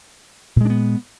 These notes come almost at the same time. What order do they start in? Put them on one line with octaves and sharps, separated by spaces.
A#2 G#3 D4 B3